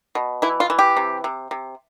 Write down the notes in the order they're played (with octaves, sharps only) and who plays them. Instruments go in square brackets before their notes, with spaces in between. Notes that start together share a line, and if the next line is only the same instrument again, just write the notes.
[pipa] B2
E3 E4
F4
E3
G4
C3
C3
C3